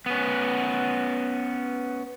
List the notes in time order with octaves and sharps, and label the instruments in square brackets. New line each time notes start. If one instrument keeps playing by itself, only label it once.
[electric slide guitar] B3 C#4